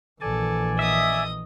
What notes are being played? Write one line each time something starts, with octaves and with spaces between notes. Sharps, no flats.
A#1 E3 A4 D5 G#5
D#5 E5 D#6